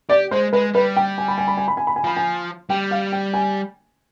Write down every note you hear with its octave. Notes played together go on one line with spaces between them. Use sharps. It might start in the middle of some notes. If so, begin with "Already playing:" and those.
G4 D5
G#3 C5
G#3 B4
G3 B4
G5
G#5
B5
G#5
B5
G#5
B5
G#5
B5
G#5
F3 B5
G#5
G3 G5
F5
G5
G#5